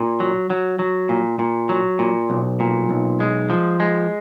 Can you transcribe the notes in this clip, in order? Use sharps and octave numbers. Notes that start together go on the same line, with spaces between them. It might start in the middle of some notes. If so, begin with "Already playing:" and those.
Already playing: A#2
F#3
F#3
F#3
A#2
A#2
F#3
A#2
B1
A#2
B1
G#3
F3
G#3